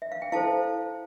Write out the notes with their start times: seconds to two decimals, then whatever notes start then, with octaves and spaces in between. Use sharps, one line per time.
0.02 E5
0.12 F5
0.22 G5
0.32 E4 A4 C5 F5 A5